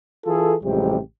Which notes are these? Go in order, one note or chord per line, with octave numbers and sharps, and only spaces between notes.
E3 F4 G#4 A4
A1 F2 C3 G3 G#3 G4